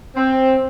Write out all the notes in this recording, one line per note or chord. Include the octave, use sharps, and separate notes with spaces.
C4